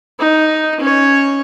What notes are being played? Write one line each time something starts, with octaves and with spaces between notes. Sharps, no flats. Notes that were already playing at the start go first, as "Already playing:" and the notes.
D#4
C#4 C#5